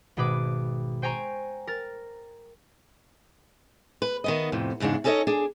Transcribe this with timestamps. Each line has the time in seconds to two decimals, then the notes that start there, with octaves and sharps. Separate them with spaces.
0.17 G#1 B2 G#4 B4 D6
1.02 C5 G5 G#5 A#5 C#6
1.67 A#4 A6
4.02 B4
4.24 D#3 B3 D#5
4.52 F2 A2 C3
4.80 E2 G#2 C#3 G#3 D4
5.04 C#4 D#4 A4 A#4 C#5 D#5
5.27 D4 G#4